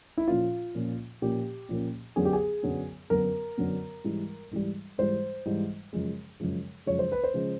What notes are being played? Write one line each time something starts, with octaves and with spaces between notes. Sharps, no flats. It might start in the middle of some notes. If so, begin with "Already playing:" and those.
E4
A#2 F3 A#3 C#4 F4
A#2 F3 A#3 C#4
A#2 F3 A#3 C#4 G4
A#2 F3 A#3 C#4
F#2 D3 F#3 B3 G#4
G4
G#4
F#2 D3 F#3 B3
F#2 D3 F#3 B3 A#4
F#2 D3 F#3 B3
G#2 E3 G3
G#2 E3 G3
G#2 E3 G3 C5
G#2 E3 G3
F#2 C#3 F3 G#3
F#2 C#3 F3 G#3
F#2 C#3 F3 G#3 C#5
C5
B4
C5
C#3 F3 G#3